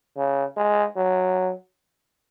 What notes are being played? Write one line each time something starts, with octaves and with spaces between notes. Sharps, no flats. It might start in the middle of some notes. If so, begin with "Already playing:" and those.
C#3
G#3
F#3